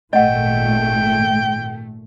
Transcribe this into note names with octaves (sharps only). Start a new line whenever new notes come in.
G#1 A#2 A3 D#5 F#5 G5